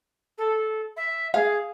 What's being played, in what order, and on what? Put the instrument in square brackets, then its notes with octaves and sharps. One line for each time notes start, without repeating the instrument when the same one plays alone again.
[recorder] A4
E5
[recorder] G#4 [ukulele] F5